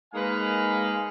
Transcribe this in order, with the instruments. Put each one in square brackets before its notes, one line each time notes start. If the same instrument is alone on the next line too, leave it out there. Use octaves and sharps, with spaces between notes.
[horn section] G#3 A#3 D#4 B4 F5 G#5